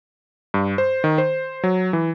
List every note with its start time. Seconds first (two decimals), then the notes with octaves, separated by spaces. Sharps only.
0.54 G2
0.78 C5
1.04 D#3
1.18 C5
1.63 F#3
1.93 E3